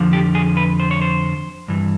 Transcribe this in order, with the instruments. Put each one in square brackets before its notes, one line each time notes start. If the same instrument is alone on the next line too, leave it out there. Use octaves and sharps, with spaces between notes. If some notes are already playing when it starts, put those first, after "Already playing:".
Already playing: [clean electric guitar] F2 D3 F3
G4
G#4
B4
C5
C#5
C5
G2 E3